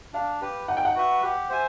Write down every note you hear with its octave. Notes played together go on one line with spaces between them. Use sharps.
D4 F5
G4 B4
D#4 F#5
G5
F#5
F#4 B4 E5
G4
C5 E5 G#5